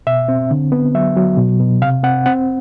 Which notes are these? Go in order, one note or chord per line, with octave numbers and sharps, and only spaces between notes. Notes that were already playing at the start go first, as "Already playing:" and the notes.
B2 E5
C4
D3
B3
F#3 E5
F#3
B2
B2
C3 F5
C4 F#5
C4 F#5